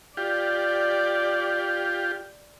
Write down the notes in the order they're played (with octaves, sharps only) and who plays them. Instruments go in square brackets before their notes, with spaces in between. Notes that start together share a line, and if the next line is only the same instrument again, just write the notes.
[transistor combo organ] F4 G4 [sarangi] D5